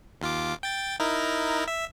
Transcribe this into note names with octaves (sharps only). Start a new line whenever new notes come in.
D#2 F4 D6
G5 A6
D#4 E4 A#4
E5